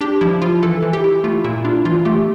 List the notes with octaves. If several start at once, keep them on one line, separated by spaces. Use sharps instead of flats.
D4 G4
F3 E4
F3 F4
E3 A4
E3
G4
E4
A3 F4
A#2 E4
D4 F4
E3 F4
A3 G4